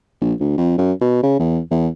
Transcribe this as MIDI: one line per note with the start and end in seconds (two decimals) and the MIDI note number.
0.21 0.33 34
0.40 0.53 38
0.58 0.74 41
0.78 0.93 42
1.01 1.22 47
1.23 1.36 49
1.39 1.60 40
1.71 1.88 40